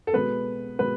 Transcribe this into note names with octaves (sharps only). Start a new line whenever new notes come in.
A4
B2 G#3 B3 B4
B2 G#3 B3 B4